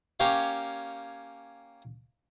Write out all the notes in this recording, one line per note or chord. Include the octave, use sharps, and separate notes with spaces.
A#3 C#4 G4 C#5 F5